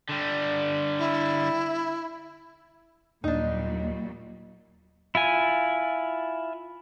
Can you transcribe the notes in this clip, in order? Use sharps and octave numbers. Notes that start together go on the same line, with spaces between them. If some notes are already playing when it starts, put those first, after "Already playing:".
D3 G3
E4
D#2 A#2 F#3 G3 D4 D#4 D#5
E4 F4 G#5